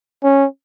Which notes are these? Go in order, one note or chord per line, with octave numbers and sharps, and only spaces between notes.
C#4